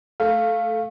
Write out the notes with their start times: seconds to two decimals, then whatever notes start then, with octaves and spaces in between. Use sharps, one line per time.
0.20 A3 F5